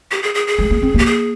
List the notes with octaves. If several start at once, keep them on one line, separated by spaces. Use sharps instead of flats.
G4
G#4
G#4
G#4
G#3
A#3
C4
A#3 G4
G#4